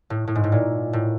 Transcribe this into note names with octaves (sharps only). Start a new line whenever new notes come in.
A2
A2
G#2
A2
A#2
A2